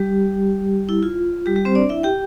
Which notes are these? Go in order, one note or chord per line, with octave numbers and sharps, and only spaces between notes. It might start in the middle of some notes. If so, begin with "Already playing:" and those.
Already playing: G3 G4
E4
F4
G3 G4
G3 G4
C4 C5
D4 D5
E4 E5
G4 G5